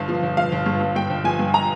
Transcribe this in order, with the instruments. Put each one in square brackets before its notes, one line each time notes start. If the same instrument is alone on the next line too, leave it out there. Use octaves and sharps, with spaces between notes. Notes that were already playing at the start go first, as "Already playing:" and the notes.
Already playing: [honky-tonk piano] G1 G2 F5
F3
G1
F3 F5
G1
G2
G2
G2 G5
G1
F3 G#5
G2
A#5